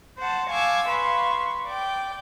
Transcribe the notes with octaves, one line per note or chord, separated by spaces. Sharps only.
C5 F#5 A5
F5 G#5 A5 C#6 D6 E6
B4 F5 C6 C#6
D5 G5